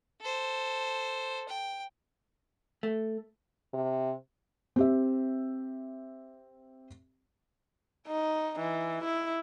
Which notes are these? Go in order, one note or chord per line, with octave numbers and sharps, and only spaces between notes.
A4 C5
G5
A3
C3
C4 G4 E5
D#4
E3
E4